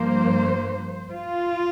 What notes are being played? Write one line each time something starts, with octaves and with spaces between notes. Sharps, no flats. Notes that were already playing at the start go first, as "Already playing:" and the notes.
Already playing: G2 F3 A#3 C5
F4